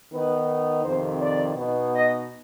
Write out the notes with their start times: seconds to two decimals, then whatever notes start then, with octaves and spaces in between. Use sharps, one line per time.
0.12 D#3 B3 D#4 B4
0.84 F2 C3 D#3 C5
1.21 D5
1.56 B2 B3 D#4
1.92 D#5